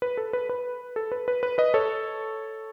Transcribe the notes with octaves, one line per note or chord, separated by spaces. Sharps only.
B4
A4
B4
B4
A4
B4
B4
B4
B4 D#5
A4 C#5